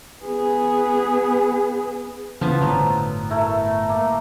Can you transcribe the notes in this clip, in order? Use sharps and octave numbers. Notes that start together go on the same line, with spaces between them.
B3 G#4
C#3 E3 F3 B3
G1 A2 F#3
A3 E4 A#4
A#3